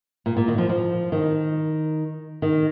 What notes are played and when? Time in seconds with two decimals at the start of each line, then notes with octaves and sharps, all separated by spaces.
0.26 A#2
0.37 A#2
0.48 D#3
0.58 F3
0.69 F3
1.12 D#3
2.42 D#3